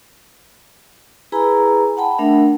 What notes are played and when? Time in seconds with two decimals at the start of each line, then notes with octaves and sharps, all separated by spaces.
1.32 E4 G#4 B4 G#5 A#5 B5
1.97 F#5 G5 A5 B5
2.18 A3 D4 A#4 E5 F#5